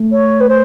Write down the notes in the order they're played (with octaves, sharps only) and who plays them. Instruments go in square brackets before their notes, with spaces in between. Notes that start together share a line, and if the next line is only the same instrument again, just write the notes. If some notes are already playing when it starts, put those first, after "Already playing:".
Already playing: [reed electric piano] A3
[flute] C#5
B4
C5